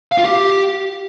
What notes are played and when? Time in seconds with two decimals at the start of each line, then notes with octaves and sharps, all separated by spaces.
0.12 F5
0.18 F4
0.25 G4